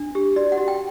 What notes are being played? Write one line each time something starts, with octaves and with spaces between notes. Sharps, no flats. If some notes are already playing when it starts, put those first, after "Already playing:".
Already playing: D4
G4
F#4 D5
F#5
F#4
G5